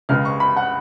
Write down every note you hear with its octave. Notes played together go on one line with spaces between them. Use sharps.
C#2 C#3 G#3 F6
C#6
B5
F#5